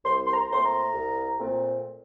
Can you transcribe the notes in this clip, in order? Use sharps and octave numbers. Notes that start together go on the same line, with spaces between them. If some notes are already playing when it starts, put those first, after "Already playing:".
C2 C6
C6
A#5
A#2 A3 C4 C6
A#5
C2
A#2 A3 C4